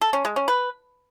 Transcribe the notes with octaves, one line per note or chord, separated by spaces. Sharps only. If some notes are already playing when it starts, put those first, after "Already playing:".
A4
C#4
G#3
C#4
B4